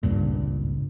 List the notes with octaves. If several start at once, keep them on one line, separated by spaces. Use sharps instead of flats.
G#1 C#2 G2 A#2